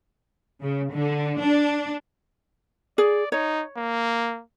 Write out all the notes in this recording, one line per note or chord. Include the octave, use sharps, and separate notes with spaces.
C#3
D3
D4
G#4 D5
D#4 C#5
A#3